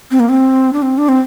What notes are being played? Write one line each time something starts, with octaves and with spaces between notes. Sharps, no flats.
C4
A#3
C4
D4
C4
D4
C4